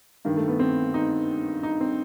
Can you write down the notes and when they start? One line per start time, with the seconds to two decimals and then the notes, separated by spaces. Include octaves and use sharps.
0.25 G2 D#3
0.37 A3
0.48 B3
0.59 C4
0.94 D#4
1.63 D#4
1.81 C4